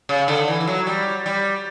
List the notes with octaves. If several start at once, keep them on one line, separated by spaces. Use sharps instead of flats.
C#3
D3
E3
E3
F#3
G3
G3